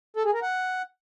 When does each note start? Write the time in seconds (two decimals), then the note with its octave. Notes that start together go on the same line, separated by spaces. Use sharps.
0.17 A4
0.25 G#4
0.34 A#4
0.42 F#5